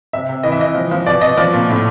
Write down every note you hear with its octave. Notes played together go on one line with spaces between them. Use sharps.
C3 E5
C3
E3 D#5
E5
E3 D#5
F3
F3
B2 D5
B2 D#5
F3 D5
A#2
A2